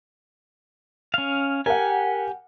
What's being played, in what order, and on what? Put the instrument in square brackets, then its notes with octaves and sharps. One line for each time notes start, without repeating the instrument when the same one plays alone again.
[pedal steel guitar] C#4 F5
[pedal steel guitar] G4 G#5 [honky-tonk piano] A#4 F#5